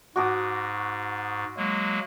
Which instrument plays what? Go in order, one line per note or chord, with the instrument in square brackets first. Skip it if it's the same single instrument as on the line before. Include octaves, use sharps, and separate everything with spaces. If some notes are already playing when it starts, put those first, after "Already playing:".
[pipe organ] G#2 [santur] F#4 D6 D#6
[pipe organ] F#3 G#3 A#3